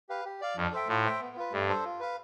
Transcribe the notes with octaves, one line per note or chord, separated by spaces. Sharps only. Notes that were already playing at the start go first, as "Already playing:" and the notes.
G4 B4 F5
G4
D5 F5
F2 D4
A4 C5 E5 G5
A2 F4
C5 E5 G5
B3
F4 B4
G2 A3
D4 A4 C5
F4
B4 F5